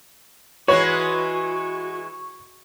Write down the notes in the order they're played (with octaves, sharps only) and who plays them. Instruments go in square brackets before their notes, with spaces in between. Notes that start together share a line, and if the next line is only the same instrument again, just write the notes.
[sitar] E3 G#3 B4 [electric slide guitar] F#4 [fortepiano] C#5 [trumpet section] C#6